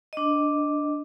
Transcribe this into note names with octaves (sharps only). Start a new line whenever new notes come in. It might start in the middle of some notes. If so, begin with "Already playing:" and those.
D4 D#5